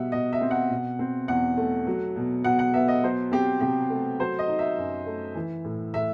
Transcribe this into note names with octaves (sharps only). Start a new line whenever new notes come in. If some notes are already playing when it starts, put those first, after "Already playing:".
Already playing: B2 G3 E5 F#5
B2 D#5
E5
C4
F#5
B2
C4
E2 F#5
A3
F#3
B2
B2 F#5
F#5
B3 E5
D#5
F#3 C5
C4 G4
C3 G4
A3
F#3 C5
D#5
D#4
E5
F#2
A3
E3
A2
A2 E5